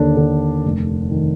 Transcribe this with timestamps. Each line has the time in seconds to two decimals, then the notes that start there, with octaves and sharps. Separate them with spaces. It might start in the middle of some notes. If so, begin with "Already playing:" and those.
Already playing: D#2 D3 D4
0.17 D3
0.65 F1
1.11 D#3